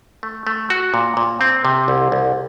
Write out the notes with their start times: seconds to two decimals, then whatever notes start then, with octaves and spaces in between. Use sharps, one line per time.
0.23 A3
0.47 A3
0.70 F#4
0.94 A#2
1.17 A#2
1.41 C4
1.65 C3
1.88 C2
2.12 C2